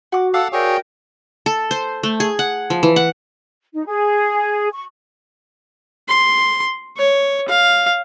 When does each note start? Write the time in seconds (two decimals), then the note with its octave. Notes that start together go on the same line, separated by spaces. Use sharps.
0.12 F#4 F#5 D6
0.34 A4 F5 F#5 D6 E6
0.53 F#4 G#4 A#4 C#5 D5 G5
1.46 A4
1.71 C5
2.03 A3
2.20 G#4
2.39 F#5
2.70 F3
2.83 E3
2.96 F#5
3.73 D#4
3.86 G#4
4.73 C#6
6.09 C6
6.97 C#5
7.49 F5